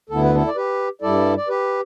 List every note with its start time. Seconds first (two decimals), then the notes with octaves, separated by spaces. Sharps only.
0.09 D2 D3 B3 E4 A4
0.23 B4
0.35 E4 A4
0.47 D5
0.56 G4 B4
1.02 G2 G3 E4 A4 D5
1.37 D5
1.48 G4 B4